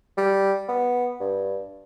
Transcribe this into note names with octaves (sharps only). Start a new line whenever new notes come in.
G3
B3
G2